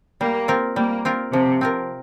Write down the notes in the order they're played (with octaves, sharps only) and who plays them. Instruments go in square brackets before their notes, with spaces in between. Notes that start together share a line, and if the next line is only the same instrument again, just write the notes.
[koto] G3 [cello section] A#3
[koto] C4 F4 A#4
[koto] G3 [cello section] A#3
[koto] C4 F4 A#4
[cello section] C3 [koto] F3
[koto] C4 F4 A#4